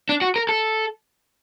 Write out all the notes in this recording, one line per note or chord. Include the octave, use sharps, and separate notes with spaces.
D4
F#4
A#4
A4